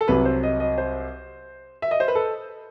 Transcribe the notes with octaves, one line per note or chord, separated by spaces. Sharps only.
A4
C2 C3 F#3 B4
C5
D#5
D#5
C5
E5
D#5
C5
B4
A4